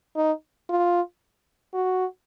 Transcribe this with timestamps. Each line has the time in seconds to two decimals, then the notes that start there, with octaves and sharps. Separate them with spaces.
0.16 D#4
0.70 F4
1.74 F#4